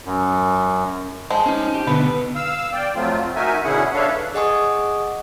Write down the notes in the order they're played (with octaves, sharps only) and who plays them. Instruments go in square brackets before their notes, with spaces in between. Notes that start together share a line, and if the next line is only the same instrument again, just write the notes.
[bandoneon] F#2
[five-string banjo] F3 G#3
[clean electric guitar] C#4 D#4
G4
[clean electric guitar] B2 D3 B3 [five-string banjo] B4
[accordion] F5 E6
D5 G5
F2 F3 F#3 A3 C4 F4
D#4 F#4 A#4 E5 G#5
B2 D3 C#4 E4 G#4 F#5
D4 A4 B4 C#5 E5 F5
[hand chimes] G#4 D#5 F#5 G#5 C#6 D#6